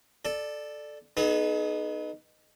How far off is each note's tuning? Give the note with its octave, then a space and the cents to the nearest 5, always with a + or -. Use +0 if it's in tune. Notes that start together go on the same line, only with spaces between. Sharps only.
A4 -5 D5 +15
B3 -5 D#4 -15 G#4 +40